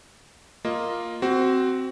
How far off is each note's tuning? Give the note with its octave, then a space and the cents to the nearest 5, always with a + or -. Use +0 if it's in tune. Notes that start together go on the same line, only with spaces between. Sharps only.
A#3 +0 F4 +0 D#5 +0
C4 +0 F#4 +20